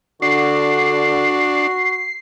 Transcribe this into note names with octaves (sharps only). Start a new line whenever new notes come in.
D3 D4 F#4 C7